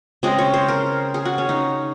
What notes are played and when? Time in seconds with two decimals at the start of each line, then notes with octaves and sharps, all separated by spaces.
0.23 C#3 G#3 C4 D#5
0.38 C#5
0.54 C5
0.68 A#4
1.14 G#4
1.25 F#4
1.38 C#4
1.49 D#4